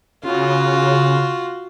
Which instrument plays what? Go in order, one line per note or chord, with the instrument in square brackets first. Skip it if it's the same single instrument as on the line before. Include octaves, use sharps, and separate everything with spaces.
[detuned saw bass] C#3 [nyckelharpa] F4 F#4